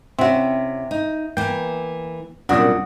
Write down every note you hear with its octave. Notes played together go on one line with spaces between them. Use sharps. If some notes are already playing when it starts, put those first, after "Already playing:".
C3 C4 C#4 E4 F#4
D#4
E3 A#3 G5
C2 F#2 A#2 D4 F#4 D#6